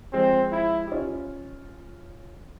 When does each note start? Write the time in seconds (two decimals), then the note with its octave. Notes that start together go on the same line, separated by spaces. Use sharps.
0.13 F3 G#3 C4
0.52 E4
0.87 G4
0.92 C#4 F4